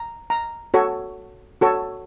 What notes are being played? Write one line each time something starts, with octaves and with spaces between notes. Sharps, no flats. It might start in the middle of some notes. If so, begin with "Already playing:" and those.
Already playing: A#5
A#5
F#4 A4 C#5
F#4 A4 C#5